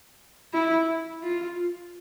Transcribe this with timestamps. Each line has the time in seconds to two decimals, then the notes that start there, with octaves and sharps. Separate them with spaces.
0.54 E4
1.23 F4